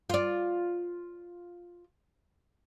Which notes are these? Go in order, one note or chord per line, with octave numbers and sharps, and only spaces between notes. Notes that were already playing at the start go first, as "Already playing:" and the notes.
F4 D5